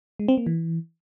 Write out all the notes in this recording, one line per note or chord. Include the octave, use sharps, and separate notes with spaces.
G#3
C4
A#3
E3